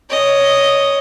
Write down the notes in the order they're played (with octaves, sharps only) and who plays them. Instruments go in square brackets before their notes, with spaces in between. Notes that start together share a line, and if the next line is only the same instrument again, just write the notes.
[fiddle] C#5 D#5